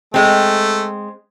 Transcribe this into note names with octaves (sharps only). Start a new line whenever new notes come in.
G#3 A3 C4